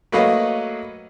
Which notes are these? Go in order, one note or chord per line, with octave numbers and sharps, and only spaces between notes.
F#3 A3 A#3 B4 D#5 F5